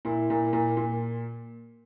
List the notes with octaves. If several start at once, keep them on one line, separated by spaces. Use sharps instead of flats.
A#2 E4
A#2
A#2
A#2